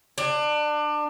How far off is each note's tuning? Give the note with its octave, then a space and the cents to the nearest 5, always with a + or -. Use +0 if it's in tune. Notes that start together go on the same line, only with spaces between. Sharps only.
D4 +25